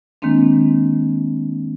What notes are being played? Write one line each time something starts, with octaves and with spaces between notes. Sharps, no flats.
D#3 G#3 A#3 C4 D4